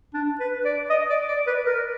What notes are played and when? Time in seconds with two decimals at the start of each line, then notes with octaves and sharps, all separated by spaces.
0.14 D4
0.40 B4
0.65 D5
0.90 D#5
1.09 D5
1.28 D5
1.47 B4
1.66 A#4